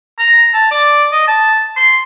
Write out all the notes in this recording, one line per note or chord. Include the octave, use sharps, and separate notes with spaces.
A#5
A5
D5
D#5
A5
C6